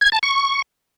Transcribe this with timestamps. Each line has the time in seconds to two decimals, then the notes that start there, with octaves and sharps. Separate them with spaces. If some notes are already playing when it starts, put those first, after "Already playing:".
0.01 G#6
0.12 A5
0.23 C#6